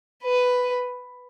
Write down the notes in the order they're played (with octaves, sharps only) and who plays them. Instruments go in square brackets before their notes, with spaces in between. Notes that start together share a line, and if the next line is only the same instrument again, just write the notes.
[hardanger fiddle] B4